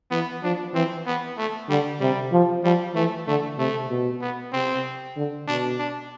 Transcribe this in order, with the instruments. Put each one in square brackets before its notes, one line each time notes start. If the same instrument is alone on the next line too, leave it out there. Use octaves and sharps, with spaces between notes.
[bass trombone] E3 [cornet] B3
[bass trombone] F3 [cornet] D4
[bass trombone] E3 [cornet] C4
[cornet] B3
A3
[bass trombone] D3 [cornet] G3
[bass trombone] C3 [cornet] G3
[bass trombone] F3
[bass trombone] F3 [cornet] G3
[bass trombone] E3 [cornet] A3
[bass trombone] D3 [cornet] A3
[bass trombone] C3 [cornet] A3
[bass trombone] B2
[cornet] B3
[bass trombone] C3 [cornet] C4
[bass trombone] D3
[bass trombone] B2 [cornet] D4
[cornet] D4